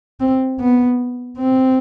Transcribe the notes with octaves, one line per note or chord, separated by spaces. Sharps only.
C4
B3
C4